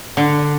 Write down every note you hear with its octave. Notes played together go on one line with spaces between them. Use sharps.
D3